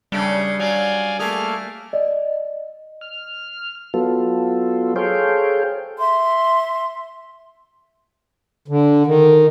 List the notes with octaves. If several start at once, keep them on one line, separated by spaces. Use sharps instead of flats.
C#3 G3 A3 D4
F#3 D5 F5 G#5
A3 A#3 G#4 F6
D5 D#5
F6
F#3 B3 F4 A4
G#4 A4 C5 C#5 F5 G5
E5 C6
D3
D#3